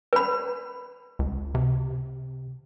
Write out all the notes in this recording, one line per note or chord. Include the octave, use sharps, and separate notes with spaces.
B4 B5
C#2
C3